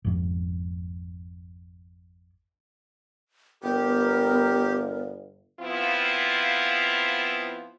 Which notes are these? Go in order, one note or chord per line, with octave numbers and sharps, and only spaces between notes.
G#1 F2
G1 B3 G4 A#4
F3 B3 C4 E4 F4